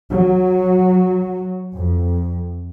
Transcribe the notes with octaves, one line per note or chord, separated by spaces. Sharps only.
F#3
F2